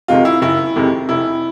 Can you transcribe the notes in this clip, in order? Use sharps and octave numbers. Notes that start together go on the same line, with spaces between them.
F2 C3 D#3 G#3 F4
E4
F#1 E4
F2 C3 D#3 G#3
F1 E4